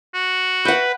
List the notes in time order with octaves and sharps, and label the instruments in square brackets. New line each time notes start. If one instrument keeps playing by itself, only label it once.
[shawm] F#4
[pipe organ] B4 [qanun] F#5 G5